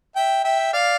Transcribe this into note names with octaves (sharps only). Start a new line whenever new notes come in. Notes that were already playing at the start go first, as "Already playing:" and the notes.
E5 G5
E5 G5
D5 F5